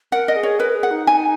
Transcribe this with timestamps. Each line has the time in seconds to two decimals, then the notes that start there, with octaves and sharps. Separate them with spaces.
0.12 A#4 F#5
0.28 D#5
0.36 G#4
0.43 C#5
0.59 A#4 B4
0.75 G#4
0.83 F#5
0.91 D#4
1.07 G#5